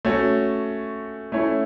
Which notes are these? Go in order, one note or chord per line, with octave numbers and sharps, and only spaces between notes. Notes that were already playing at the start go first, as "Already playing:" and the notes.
A3 C#4 F#4
A3 C#4 E4